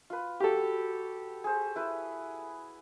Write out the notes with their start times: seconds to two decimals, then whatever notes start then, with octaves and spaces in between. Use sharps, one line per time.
0.10 F4 B4
0.40 F#4 G4 A4
1.44 G#4 C5
1.76 E4 B4